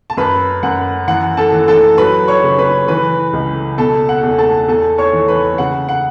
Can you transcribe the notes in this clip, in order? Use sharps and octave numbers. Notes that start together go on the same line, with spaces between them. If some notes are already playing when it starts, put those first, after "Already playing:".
A5
F#2 B4 B5
F#2 F#5
E3 F#5
A4 A5
E3
A4 A5
F#3 B4 B5
C#5 C#6
C#3
B4 B5
E3 B4 B5
C#2
B2 A4 A5
F#5
E2
A4 A5
E2 A4 A5
C#5 C#6
E3
B4 B5
C#3 F#5
F#5